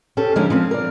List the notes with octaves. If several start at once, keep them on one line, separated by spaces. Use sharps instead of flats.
C#4 G4 A4
D3 F3 G#3 A#3 C#4
F3 C4 C#4
A#4 D5